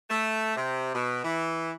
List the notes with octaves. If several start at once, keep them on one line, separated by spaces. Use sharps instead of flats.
A3
C3
B2
E3